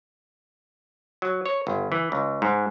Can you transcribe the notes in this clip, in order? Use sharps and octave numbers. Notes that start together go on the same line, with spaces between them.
F#3
C#5
G1
E3
C#2
G#2